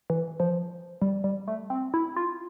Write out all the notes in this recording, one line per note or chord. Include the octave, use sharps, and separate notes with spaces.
E3
F3
G3
G3
A3
C4
E4
F4